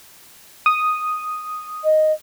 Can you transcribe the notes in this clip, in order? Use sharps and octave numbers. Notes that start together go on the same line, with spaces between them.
D#6
D#5